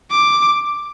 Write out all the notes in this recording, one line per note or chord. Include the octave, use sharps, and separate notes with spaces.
D6